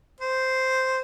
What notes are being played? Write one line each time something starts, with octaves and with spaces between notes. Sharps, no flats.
C5